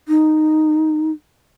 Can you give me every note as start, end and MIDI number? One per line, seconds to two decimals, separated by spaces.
0.08 1.11 63